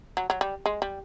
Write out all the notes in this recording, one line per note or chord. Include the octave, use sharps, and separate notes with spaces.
F#3
F#3
G3
G#3
G3